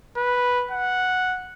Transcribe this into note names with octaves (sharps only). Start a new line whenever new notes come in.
B4
F#5